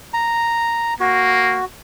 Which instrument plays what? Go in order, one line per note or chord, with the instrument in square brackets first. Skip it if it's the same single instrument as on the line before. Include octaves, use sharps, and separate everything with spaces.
[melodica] A#5
[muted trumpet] A#3 [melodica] F#4